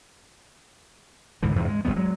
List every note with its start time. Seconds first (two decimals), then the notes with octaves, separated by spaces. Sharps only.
1.42 C#2 G#2 D3 E3
1.56 E2 G#2 C3
1.68 G#3
1.85 G1 F#2 G3 B3
1.96 F#3 G#3